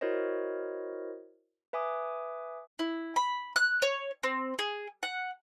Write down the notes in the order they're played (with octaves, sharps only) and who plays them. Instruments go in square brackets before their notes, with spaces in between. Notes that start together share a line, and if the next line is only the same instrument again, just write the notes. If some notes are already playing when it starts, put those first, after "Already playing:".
[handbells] E4 F#4 A#4 C5 C#5 D#5
B4 E5 G#5 D6 D#6
[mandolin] E4
B5
F#6
C#5
C4
G#4
F#5